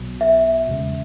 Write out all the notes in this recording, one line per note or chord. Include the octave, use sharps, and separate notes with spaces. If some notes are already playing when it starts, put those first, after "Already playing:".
Already playing: B1 B2 F#3
E5
E2 C#3 G#3